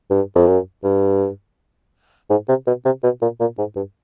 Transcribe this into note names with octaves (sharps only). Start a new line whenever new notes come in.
G2
F2
F#2
G2
G#2
C3
B2
C3
B2
A#2
A#2
G#2
G2